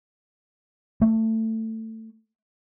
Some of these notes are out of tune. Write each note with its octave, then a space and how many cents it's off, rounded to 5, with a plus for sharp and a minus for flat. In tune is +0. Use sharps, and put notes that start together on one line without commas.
A3 +20